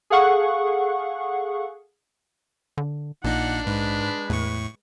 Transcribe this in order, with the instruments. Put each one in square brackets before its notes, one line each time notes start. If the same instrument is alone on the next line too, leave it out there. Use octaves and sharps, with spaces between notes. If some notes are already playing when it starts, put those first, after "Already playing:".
[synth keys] G#4 A4 F5 F#5 C#6
[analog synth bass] D3
[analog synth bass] A#1 [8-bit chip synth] A#2 D#4 [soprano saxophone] D4 [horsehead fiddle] F#5
[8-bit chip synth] G#2 [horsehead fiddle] G#3 B4
[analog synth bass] E2 [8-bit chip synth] A2 C#6